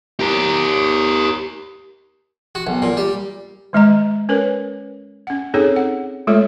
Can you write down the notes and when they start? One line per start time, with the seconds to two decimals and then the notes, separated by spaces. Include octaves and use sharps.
0.20 G4 A#4
2.55 F#4
2.67 B1
2.82 A#2
2.97 G3
3.73 D#3 G#3 D#5 A#5
4.29 C#4 A#4 B4 C#5
5.27 C#4 F#5
5.54 C4 C#4 D#4 G#4 A4 C#5
5.76 F#5
6.27 G#3 A3 F4 A4 C#5 D5